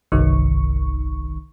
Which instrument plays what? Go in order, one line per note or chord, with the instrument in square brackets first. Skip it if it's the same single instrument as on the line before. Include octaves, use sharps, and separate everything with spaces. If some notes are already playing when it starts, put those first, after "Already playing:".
[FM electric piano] G1 C2 D#3 C#6